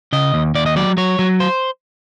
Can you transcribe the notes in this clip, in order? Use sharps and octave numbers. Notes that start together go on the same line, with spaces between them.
C#3 D#5
D#2
D#2 D5
D#5
F#3 D5
F#3 C#5
F#3
C5